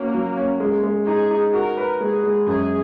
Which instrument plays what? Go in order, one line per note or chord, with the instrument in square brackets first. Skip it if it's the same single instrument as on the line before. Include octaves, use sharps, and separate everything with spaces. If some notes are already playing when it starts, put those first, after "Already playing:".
Already playing: [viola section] A#3 [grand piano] C#4 F#4
[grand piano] F#3
C#4
G#3
G#3
[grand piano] D#4 [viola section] G#4
[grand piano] D#4
[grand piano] F#4 [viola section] A#4
[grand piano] B4
[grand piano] G#3 [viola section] G#4
[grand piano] G#3
[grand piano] F#2 [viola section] G#4